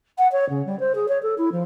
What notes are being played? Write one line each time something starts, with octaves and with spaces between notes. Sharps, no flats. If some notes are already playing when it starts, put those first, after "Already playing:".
F#5
C#5
C#3
G3
C5
G#4
C#5
A4
E4
F3